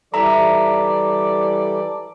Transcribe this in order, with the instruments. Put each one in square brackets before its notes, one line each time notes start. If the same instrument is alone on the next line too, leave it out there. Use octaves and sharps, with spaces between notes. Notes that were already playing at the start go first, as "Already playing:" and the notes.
[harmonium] E3 G3 A4 [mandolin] D4 E4 E5 [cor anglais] D5 [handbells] A#5